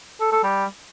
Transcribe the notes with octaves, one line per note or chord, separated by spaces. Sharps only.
A4
A4
G3